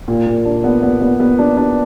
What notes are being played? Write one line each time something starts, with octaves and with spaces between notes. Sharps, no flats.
A#2
A#2
D4
B3
B3
B3
B3
D4
D4